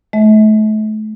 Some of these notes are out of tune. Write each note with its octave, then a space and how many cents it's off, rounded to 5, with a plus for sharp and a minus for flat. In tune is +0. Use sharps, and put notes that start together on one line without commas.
A3 -35 E5 -45